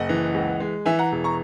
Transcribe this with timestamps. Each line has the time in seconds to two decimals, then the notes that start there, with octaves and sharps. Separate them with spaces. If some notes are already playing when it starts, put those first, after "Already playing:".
Already playing: F#1 D#5 F#5
0.09 E3
0.34 C#2
0.60 G#3
0.86 E3 E5 G#5
0.99 F#5 A#5
1.12 E1
1.24 A#5 C#6